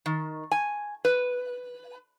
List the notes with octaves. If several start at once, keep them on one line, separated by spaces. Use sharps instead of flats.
D#3
G#5
B4